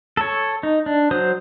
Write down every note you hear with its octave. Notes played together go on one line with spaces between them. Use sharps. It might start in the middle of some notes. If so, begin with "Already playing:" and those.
A4 C#5
D#4
D4
F#3 C5 D#6